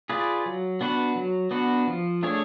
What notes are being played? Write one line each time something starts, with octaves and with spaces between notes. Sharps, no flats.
F4 G#4 B4 D5
F#3
B3 D4 F#4 B4
F#3
B3 D4 F#4 B4
F3
A3 D4 G#4 C#5